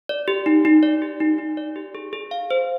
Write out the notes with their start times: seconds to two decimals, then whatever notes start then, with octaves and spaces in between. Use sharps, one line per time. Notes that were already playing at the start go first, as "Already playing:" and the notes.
0.09 D5
0.28 G4
0.46 D#4
0.65 D#4
0.83 D5
1.02 G4
1.20 D#4
1.38 D#4
1.57 D5
1.76 G4
1.95 G#4
2.13 G#4
2.31 F5
2.51 C5